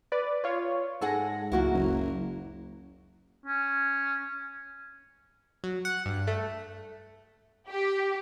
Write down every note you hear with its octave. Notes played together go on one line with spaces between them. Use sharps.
B4 D5
F4 C#5
G#2 G#3 G#4 A4 F#5 A#6
C#2 F#3 A#3 E4 F#4
F#1
C#4
F#3
F#5
G2
A3
G4